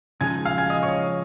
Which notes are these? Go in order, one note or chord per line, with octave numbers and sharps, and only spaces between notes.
C#3 F3 G#3 D#4 G#5 G#6
F5 F6
G#5 G#6
D#5 D#6
C#5 C#6